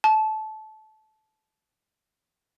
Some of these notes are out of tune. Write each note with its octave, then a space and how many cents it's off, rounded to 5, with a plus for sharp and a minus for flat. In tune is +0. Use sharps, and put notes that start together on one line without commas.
A5 -20